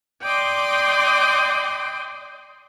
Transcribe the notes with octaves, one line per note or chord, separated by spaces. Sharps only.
D5 D#5 G5 C6 D6